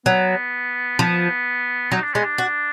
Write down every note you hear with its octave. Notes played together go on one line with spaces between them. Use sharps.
F#3 B3
F3 B3
F#3 D#4
D4
G#3 B3
D4
F#4